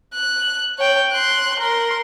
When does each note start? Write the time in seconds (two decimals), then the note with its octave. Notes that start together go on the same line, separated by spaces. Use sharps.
0.14 F#6
0.78 C#5 G5
1.12 C6 F#6
1.59 A#4 C6